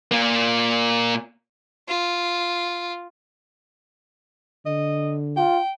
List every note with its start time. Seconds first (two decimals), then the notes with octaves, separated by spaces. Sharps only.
0.11 A#2 A#3
1.88 F4
4.66 D3 D#5
5.37 F4 G5